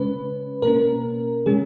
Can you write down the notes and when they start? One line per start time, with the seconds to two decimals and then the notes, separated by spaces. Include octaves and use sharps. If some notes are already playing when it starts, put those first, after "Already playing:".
Already playing: C#3 G#3 C#4 B4
0.62 B2 A#3 C#4 A#4
1.46 C#3 G#3 C#4 G#4